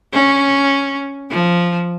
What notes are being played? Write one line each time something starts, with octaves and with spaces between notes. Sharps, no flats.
C#4
F3